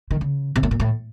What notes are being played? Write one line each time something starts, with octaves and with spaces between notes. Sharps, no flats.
D#3
C#3
C3
A2
A#2
A2